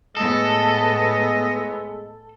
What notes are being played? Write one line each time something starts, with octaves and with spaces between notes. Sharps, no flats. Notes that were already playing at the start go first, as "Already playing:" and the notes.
A2 G#3 B3 A4 D#5